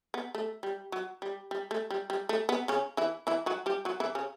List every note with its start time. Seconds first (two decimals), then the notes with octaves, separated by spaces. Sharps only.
0.14 B3
0.35 A3
0.63 G3
0.92 F#3
1.22 G3
1.51 G3
1.71 A3
1.90 G3
2.10 G3
2.29 A3
2.49 B3
2.68 C#3 C#4
2.97 E3 E4
3.27 E3 E4
3.46 F#3 F#4
3.66 G3 G4
3.85 F#3 F#4
4.00 E3 E4
4.15 C#3 C#4